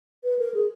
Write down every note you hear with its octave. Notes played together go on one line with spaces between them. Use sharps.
B4
A#4
G#4